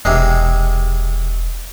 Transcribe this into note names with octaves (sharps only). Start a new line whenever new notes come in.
E1 C3 G#3